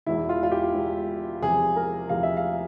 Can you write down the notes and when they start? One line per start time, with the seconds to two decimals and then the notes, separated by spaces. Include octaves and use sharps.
0.06 E1 E2 E3 E4
0.29 F4
0.43 F4
0.52 G4
0.74 E1 E2 E3
1.42 E2 C3 F3 G#4
1.76 A#4
2.09 E2 C3 F3 F5
2.23 E5
2.37 F5